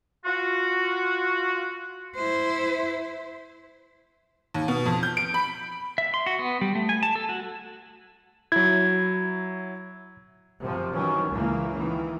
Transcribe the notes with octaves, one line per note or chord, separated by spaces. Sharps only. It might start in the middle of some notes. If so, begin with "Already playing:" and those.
F4 F#4
E4 C5
D#2
B2
F2
G6
D7
B5
E5
C6
F#4
B3
G3
A3
G#5
A5
A4
F#4
F#3 E4 G#6
F#2 C3 F3
D#3 E3 F#3 C#4
C#2 C#3 E3 A#3
D#3 E3